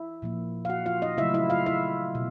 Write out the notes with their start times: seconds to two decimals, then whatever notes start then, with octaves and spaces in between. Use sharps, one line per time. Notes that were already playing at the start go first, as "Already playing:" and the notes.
Already playing: E4 E5
0.22 A#2 F3 A#3
0.65 F5
0.69 F#4 F#5
0.86 F4 F5
1.02 D#4 D#5
1.18 C#3 F#3 A3 E4 E5
1.34 E4 E5
1.50 F4 F5
1.66 E4 E5
2.15 B2